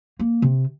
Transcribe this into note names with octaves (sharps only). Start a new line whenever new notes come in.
A#3
C3